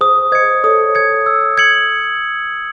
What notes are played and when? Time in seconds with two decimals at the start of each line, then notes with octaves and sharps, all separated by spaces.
0.01 G#4 C5 D#6
0.32 C5 D#5 G#6 C#7
0.64 A4 C#5 D#6
0.95 G#6 C#7
1.26 E6
1.58 G#6 C#7 F#7